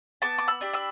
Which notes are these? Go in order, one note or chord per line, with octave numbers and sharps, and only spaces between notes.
B3 A5 D6
D6
B5 E6
D4 G4
B5 E6